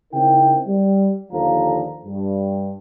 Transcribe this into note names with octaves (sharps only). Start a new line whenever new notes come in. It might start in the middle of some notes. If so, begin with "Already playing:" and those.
C#3 C4 D#4 E4 A#4 G5
G3
D#2 D3 F3 A4 F5 A#5
G2